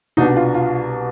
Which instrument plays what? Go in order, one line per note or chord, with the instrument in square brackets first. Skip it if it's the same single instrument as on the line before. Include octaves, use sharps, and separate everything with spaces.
[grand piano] C2 B2 B3 D4 D#4
F4
F4